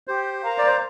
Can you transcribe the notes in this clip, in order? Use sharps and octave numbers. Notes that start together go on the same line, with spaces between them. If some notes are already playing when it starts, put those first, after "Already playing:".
G4 C5
A#4 F5 A#5
D5
C5